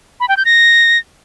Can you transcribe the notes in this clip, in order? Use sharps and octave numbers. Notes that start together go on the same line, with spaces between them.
B5
G5
G6
A#6